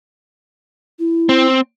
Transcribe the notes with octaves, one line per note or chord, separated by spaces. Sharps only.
E4
C4